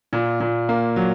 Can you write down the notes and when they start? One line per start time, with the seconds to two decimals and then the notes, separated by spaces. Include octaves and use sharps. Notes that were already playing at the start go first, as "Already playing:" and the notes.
0.13 A#2
0.40 A#2
0.69 A#3
0.96 F#3